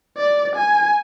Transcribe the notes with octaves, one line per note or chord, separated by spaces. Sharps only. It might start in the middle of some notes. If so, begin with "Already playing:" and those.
D5
G#5